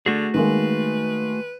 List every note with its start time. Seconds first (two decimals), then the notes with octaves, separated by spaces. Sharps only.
0.06 D3 A3 F#4 G#4
0.34 D#3 G#3 A#3 B4